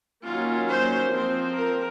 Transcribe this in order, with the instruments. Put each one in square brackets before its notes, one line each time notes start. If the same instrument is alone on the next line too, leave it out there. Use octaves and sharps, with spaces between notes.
[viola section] D#3 F#3 A#3 C#4 F4
C5
F3 C4 C5
A#4